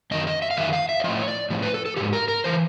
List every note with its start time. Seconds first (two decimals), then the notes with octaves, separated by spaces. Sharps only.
0.11 F#2 D#3 D#5
0.27 D#5
0.42 E5
0.51 F5
0.57 F#2 D#3 E5
0.73 F5
0.89 E5
1.00 D5
1.04 A2 F3 D#5
1.19 C#5
1.28 D5
1.50 A2 F3
1.62 B4
1.74 A4
1.86 A4
1.97 E3 G4
2.00 G#2
2.13 A#4
2.28 A#4
2.44 E3 C5